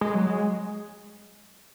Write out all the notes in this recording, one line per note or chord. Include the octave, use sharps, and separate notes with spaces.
G#3
F#3
G#3